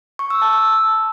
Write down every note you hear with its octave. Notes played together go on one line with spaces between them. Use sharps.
C#6
E6
A5
E6